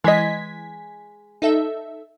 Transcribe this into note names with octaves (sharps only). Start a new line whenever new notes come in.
E3 G#3 D#5 G#6 B6
D#4 A4 E5